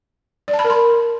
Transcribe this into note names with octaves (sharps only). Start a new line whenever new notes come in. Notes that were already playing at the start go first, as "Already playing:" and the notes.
D5
A5
B5
A#4
C6